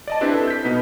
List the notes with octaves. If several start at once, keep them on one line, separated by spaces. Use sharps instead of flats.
D5 D#5 A5
C4 D4 E4 G4 B4
A4
G6 B6
B2 B3 D#4